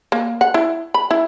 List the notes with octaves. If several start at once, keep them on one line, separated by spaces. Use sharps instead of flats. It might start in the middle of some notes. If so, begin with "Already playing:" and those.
A#3
F#5
E4
B5
E4